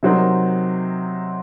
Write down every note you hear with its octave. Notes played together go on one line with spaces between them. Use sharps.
C3 F#3 C4 D#4 A#4